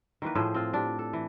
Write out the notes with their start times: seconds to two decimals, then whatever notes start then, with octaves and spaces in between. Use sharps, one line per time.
0.22 D#3 E3 A#3 B4
0.35 A2 F3 G#4 C5
0.54 C4 F4
0.74 D4 G4
0.99 A4
1.13 E3